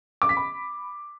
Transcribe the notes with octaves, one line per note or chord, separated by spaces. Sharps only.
D6
B6
B5